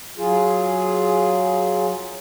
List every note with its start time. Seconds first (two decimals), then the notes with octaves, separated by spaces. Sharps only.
0.18 F#3 F4 G#4